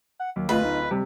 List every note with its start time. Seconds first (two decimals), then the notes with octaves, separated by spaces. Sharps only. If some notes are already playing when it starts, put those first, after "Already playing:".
0.20 F#5
0.36 D#2 F#3
0.49 D1 A3 F4 B4 D#5
0.64 D#4
0.91 C3 G3